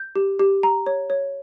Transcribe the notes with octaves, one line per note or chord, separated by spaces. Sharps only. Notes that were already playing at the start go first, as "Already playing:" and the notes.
Already playing: G6
G4
G4
A#5
C#5
C#5